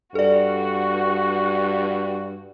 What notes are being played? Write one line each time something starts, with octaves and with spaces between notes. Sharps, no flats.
G2 F#4 A4 D5